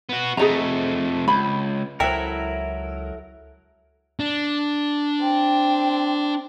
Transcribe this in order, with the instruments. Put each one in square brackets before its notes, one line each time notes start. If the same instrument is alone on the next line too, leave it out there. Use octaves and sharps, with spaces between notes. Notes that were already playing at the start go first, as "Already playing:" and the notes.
[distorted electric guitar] B3 F#4
[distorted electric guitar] F2 A3 [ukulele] G#4 D#5 A#5
[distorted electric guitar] C#2 [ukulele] B5
[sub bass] C#2 [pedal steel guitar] F#3 A#4 [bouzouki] E4 A4 E5 [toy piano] C5 G5
[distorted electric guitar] D4
[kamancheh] C4 G5